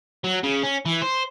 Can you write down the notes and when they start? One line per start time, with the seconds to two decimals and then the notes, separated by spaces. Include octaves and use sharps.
0.24 F#3
0.43 C#3
0.63 C#4
0.86 E3
1.02 C5